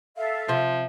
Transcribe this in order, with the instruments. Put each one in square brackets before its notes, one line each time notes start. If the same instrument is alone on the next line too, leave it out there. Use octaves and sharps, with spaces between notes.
[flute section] A4 E5 F5
[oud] C3 C5 [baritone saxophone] F3